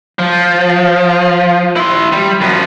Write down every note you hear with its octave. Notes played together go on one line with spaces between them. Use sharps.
F3
E4 C6
G3
F#2 F3